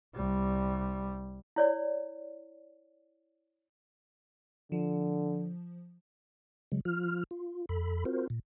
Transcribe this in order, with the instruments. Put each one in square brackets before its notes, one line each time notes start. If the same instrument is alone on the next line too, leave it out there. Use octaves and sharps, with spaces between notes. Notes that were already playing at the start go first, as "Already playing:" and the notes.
[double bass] C2 G3
[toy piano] E4 C#5 D5
[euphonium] D3 [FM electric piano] F3
[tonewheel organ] C#3 F#3 G#3
F3 F4 F6
F4
F2 A4 B5
C4 F4 F#4 A#4 C5
A#2